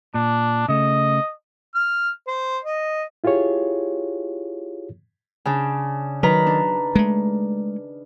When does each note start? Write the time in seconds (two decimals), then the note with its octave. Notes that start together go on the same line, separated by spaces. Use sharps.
0.14 A#2 D4
0.68 C#3 A3 D#5
1.75 F6
2.27 C5
2.64 D#5
3.24 E4 F4 G4 G#4 C#5
5.45 C#3 D4
6.23 D#3 F#3 B4 A#5
6.46 D4
6.95 G#3 A3